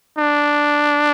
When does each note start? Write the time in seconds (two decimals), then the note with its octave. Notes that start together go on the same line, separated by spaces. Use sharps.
0.18 D4